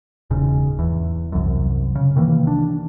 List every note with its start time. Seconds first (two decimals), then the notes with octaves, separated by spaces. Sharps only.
0.30 E1 G#2 C#3
0.79 E2
1.32 C2 F#2
1.95 C#3
2.16 C3 D#3 E3 A#3
2.47 D4